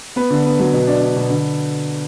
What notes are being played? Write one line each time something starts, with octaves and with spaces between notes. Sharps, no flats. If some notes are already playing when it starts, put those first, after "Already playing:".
B3 B4
D3
B3
F#3
B2
D4
D4
B2
D3